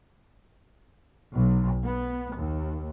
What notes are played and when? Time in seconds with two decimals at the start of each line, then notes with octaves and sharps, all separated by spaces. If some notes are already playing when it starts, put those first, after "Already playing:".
1.33 B1
1.84 B3
2.37 D#2